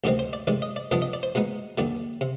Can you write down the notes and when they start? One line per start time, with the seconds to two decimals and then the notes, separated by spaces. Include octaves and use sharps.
0.04 D2 C3 D#3 G3 C4 G4
0.19 C5
0.33 D5
0.47 C3 D#3 G#3 D5
0.62 D#5
0.76 D5
0.91 F2 C3 G3 B3 D4 D#5
1.02 D#5
1.13 D5
1.23 C5
1.35 B2 G#3 B3 D#4
1.78 D#2 D3 G3 D5
2.21 C3